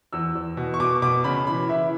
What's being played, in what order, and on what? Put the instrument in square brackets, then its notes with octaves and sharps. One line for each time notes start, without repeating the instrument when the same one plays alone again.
[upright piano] E2 E6
E2
B2
C#6
B2 D6
B2 D6
C#3 B5
E3 B5
E3 E5